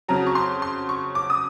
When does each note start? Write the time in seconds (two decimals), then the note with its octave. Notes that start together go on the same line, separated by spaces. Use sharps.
0.08 F2 C#3 F#3 A#5
0.27 C#6
0.35 C6
0.62 C6
0.89 C#6
1.15 D6
1.30 D#6